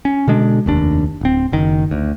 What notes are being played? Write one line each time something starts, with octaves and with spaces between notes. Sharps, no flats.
C#4
B2 D3 G#3 D4
F1 D#2 D4
D1 C4
F#1 D#3
D2